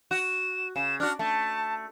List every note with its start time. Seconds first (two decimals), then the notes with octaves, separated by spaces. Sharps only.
0.11 F#4 E7
0.76 C#3 E7
1.00 D4 F#4 F6
1.19 A3 A5